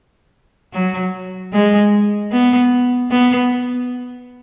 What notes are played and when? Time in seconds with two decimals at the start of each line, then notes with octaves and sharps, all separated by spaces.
0.73 F#3
1.53 G#3
2.32 B3
3.11 B3